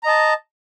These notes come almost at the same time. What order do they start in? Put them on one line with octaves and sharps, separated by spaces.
A#5 D#5 A5